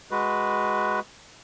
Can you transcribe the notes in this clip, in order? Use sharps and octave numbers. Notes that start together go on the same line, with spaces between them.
G#3 F#4 B4